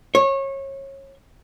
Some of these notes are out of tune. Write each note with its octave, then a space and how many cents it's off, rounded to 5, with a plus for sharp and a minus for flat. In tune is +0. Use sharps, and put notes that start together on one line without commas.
C#5 -25